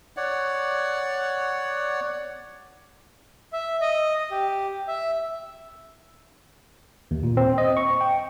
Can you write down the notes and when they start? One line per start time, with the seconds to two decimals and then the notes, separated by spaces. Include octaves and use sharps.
0.17 C#5 D5 F#5
3.53 E5
3.81 D#5
4.31 G4
4.87 E5
7.11 D#2
7.23 A#2
7.37 C4
7.58 D#5
7.77 C#6
8.01 G5